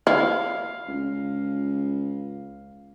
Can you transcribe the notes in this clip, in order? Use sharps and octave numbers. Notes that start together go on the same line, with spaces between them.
E4 F5
C#2